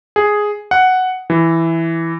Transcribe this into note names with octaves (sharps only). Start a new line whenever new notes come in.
G#4
F#5
E3